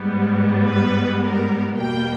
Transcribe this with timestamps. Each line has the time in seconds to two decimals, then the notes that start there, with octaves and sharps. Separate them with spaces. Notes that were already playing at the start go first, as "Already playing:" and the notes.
Already playing: G#2 G3 B3
0.67 B4
1.22 A#4
1.78 E2 B2 G3 A#3 G5